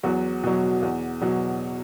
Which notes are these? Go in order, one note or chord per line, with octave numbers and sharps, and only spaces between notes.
E2 F#3 F#4
B2 F#3
E2
B2 F#3